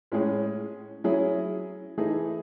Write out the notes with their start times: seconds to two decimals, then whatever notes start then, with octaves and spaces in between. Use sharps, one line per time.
0.12 A2 G#3 C#4 G#4
1.04 F#3 C#4 E4 G#4
1.98 E3 A3 D#4 G#4